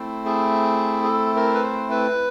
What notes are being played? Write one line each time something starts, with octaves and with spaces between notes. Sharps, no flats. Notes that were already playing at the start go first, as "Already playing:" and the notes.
Already playing: A3 C4 E4
G#4
G#4
A4
A#4
B4
C5
B4